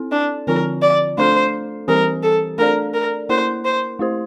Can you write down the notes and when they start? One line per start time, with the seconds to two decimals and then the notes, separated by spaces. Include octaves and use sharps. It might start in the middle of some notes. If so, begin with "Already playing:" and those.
Already playing: C4 E4 A4
0.11 D4
0.47 D3 F3 C4 F4 A#4
0.82 D5
1.18 A3 D4 A4 C5
1.88 E3 G3 C4 G4 A#4
2.23 A4
2.58 A3 D4 A4 A#4 D5
2.94 A#4
3.29 A#3 E4 A#4 C5
3.65 C5
3.99 A3 E4 G4 C5